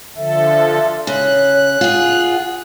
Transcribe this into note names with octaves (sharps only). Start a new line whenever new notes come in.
D3 F3 A4 E5
C#3 C#5 F#6
F4 G#4 F#5